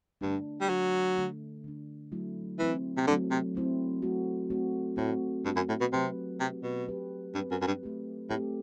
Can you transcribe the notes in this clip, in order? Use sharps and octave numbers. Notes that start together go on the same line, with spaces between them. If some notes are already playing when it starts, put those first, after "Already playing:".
G2 D3 A3 D4
G3
D3 F#3 A3 D4
D3 A3 D4
D3 A3 D4
F#3 A3 C4 E4
E3 F#3 A3 C4 E4
C3
D3 F#3 A3 C4 E4
C3
F#3 A3 C4 E4
A3 C4 F#4
A3 C4 F#4
A2 A3 C4 F#4
G2 A3 C4 F#4
F#2
A2
B2
C3 F#3 C4 G4 B4
C3 F#3 C4 G4 B4
B2
F#3 C4 G4 B4
G2 F#3 C4 G4 B4
F#2
F#2
G2
A3 C4 G4
A2 A3 C4 G4